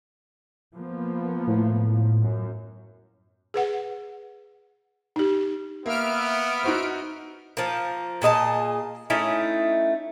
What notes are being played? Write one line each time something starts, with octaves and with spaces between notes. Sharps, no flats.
F3 A#3 B3
A2
F#2
G#4 B4 F#5
D#4 G4
A#3 B3 E5 F6 D7
D#4 F#4 C5
F3 A#3
A#2 G#4 D#5 A5
A3 C#4 D#4 E4